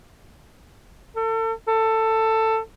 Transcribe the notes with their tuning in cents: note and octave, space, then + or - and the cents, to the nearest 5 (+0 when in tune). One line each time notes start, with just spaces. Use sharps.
A4 +35
A4 +15